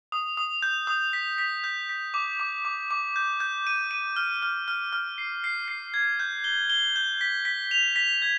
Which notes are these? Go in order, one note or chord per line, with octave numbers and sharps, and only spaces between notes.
D#6
D#6
G6
D#6
B6
B6
G6
B6
D6
D6
D6
D6
G6
G6
D#7
D#7
F6
F6
F6
F6
C7
C7
C7
G#6
G6
G7
G7
G6
B6
B6
F7
B6
G#6